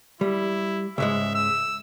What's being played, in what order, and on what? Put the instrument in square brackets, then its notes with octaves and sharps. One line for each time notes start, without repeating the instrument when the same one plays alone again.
[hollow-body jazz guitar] G3 [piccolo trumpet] E4
[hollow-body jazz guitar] C#2 G#2 G#3 [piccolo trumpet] E5
[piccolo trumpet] E6